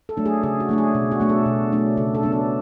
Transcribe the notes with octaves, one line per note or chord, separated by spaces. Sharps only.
A4
F#3 A3 D4
G#4
C#3 G#4
F#4
F#3 A3 D4
G#4
B2
F#4
F#3 A3 D4
A4
B2
F#3 A3 D4
C#3 A4
A4
F#3 B3 D4
A4